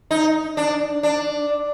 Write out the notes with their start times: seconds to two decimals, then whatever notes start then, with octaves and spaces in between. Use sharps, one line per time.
0.11 D#4
0.57 D4
1.03 D4